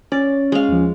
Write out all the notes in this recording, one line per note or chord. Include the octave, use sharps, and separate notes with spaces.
C#4 D5
G#3 F5
D#2 F3